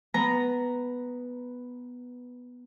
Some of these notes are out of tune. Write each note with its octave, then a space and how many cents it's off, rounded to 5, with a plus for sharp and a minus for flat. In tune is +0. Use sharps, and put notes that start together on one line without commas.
B3 +0 A#5 +0